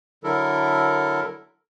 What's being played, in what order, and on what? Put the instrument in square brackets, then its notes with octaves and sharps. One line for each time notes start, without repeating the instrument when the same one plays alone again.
[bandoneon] D3 F#3 E4 A4 A#4